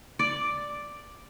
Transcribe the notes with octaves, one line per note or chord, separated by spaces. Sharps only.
D5